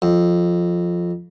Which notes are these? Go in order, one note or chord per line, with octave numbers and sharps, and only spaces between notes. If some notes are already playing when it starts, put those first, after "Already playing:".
F2